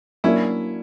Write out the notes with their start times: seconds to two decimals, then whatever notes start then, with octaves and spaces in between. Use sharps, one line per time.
0.24 F#3 A#3 C#4 D4 E4 F#4